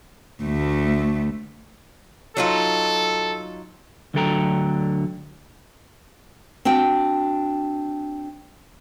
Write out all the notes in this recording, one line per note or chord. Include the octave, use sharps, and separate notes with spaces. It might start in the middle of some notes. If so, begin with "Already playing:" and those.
D2 A3
F#3 D#4 F4 A4
D2 D3 F#3 A4 G5 A#5
C4 D4 F#4 G5